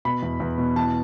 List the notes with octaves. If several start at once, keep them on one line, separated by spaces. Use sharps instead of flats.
B2 B5
E2
E2
B2
E3 A5